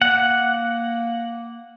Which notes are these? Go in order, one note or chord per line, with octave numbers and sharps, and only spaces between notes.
A#3 F#5